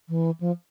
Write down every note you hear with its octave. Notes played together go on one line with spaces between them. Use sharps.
E3
F3